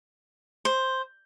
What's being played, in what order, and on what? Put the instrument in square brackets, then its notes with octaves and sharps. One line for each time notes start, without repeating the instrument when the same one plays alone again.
[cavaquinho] C5